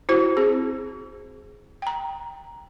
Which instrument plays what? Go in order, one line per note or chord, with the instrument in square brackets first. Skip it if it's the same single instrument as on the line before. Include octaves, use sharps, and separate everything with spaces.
[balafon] E4 F#4 C5
C4 G#4
G5 A#5